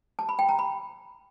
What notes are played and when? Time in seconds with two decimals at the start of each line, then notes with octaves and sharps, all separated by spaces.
0.19 A5
0.29 B5
0.39 G5
0.49 A#5
0.59 B5